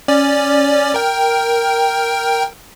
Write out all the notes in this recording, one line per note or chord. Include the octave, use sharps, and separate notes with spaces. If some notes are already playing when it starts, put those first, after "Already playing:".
C#4 D5
A#4 G5